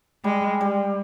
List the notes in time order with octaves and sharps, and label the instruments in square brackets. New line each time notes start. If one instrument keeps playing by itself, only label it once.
[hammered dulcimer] G3 [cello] G#3
[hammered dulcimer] G3